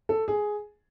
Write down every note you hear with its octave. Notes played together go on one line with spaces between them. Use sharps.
A4
G#4